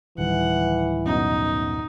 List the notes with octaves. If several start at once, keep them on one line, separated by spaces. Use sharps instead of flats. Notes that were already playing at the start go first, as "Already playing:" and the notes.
D1 D#3 E3 G3 F#5
F#2 B2 D#4